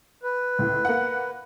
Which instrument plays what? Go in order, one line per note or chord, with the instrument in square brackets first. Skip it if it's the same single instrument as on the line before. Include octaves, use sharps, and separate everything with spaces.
[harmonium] B4
[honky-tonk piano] C#2 A2
A#3 F#5